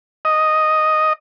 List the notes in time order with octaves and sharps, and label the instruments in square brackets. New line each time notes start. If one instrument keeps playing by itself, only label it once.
[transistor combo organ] D#5